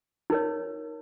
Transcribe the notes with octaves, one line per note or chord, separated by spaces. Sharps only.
D#4 A#4 C#5